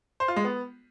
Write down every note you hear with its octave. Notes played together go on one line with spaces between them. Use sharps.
C5
F4
G#3
B3